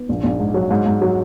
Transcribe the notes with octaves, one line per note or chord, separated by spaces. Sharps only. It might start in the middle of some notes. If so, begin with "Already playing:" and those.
Already playing: B3
A#1
A#1
G#2
F#3
G#2
G#2
F#3